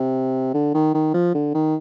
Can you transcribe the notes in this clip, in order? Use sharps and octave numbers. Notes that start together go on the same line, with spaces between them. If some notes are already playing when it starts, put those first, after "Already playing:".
Already playing: C3
D3
D#3
D#3
F3
D3
D#3